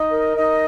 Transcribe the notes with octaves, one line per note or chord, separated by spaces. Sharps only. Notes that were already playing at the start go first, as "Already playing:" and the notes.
Already playing: D#4 D#5
A#4
D#4 D#5